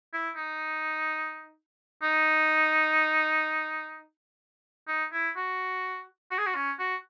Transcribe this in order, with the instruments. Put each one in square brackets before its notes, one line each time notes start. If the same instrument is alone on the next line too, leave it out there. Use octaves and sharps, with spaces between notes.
[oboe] E4
D#4
D#4
D#4
E4
F#4
F#4
G#4
F#4
C#4
F#4